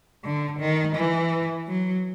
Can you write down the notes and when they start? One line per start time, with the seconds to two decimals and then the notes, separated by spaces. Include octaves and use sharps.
0.24 D3
0.60 D#3
0.95 E3
1.67 F#3